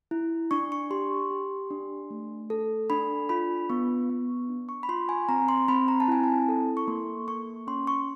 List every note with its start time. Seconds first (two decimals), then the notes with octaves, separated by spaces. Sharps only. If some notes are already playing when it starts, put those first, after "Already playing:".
0.11 E4
0.51 D4 C#6
0.72 C#6
0.91 G4 C6
1.31 G4
1.71 D4
2.10 A3
2.50 A4
2.90 D4 B5
3.29 F4 B5
3.70 B3 C#6
4.10 B3
4.49 D4
4.69 C#6
4.83 B5
4.89 F4 C6
5.09 G#5
5.29 C4 A#5
5.48 C6
5.68 C4 B5
5.88 A#5
6.00 A5
6.08 E4 G#5
6.23 A5
6.48 A4
6.77 C#6
6.88 A#3 C6
7.28 A#3 C#6
7.67 C#4 C6
7.87 C#6